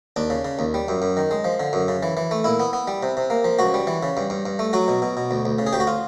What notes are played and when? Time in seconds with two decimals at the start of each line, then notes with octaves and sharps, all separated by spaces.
0.16 D#2 D4
0.30 C#3
0.45 C#3
0.59 D#2
0.74 G3
0.88 F#2
1.02 F#2
1.17 D#3
1.31 G#3
1.44 F3
1.60 D3
1.73 F#2
1.88 C#3
2.03 E3
2.17 E3
2.31 A3
2.44 A#2 E4
2.60 B3
2.73 B3
2.88 G3
3.03 C3
3.17 C3
3.30 A#3
3.44 F3
3.59 C#2 F#4
3.74 G3
3.87 E3
4.03 C#3
4.17 G2
4.30 G2
4.45 G2
4.59 A3
4.73 F#3 F#4
4.88 B2
5.02 B2
5.17 B2
5.31 D2
5.45 D2
5.59 C#3
5.66 G#4
5.73 D2 G4
5.80 F#4
5.87 F4